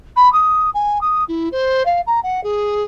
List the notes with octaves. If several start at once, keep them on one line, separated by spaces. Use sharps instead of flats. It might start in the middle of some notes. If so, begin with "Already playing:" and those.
B5
D#6
G#5
D#6
E4
C5
F5
A#5
F#5
G#4